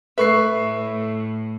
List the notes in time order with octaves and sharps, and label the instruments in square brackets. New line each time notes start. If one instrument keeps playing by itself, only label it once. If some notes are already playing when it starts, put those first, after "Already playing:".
[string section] A2 [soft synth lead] A4 [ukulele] B4 [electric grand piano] E5 C#6 C7